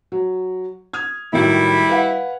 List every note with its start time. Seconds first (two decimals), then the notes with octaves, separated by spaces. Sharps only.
0.12 F#3
0.93 D#6 F6 G#6
1.33 A2 D#3 F#3 G3 E4
1.89 B4 F5 F#5